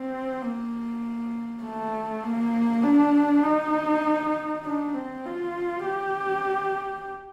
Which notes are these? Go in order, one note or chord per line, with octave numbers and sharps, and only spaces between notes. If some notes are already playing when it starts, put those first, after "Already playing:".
Already playing: C4
A#3
A3
A#3
D4
D#4
D4
C4
F4
G4